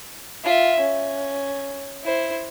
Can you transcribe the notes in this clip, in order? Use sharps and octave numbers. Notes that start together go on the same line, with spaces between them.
F4 E5
C#4
E4 C5